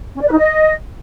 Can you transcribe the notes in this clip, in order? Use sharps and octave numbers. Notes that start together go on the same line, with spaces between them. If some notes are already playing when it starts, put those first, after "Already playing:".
C#4
D5
B4
D#4
D#5